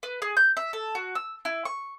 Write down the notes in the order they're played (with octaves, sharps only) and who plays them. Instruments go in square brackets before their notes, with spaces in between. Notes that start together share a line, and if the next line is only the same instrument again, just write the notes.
[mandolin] B4
G#4
G6
E5
A4
F#4
E6
E4
C#6